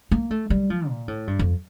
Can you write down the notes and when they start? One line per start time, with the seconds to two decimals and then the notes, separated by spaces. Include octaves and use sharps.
0.11 A#3
0.31 A3
0.50 G3
0.70 F3
0.89 A#2
1.08 A2
1.27 G2
1.39 F2